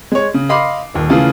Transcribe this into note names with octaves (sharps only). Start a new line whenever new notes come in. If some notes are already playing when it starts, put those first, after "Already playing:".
G#3 C#5
C#3
D#5 F5 B5 C6 D6 C7
D#1 D#2
C#3 E3 A3 F4 G#4 A4